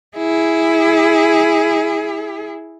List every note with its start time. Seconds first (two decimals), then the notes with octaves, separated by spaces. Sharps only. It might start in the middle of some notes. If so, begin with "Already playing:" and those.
0.17 E4 G#4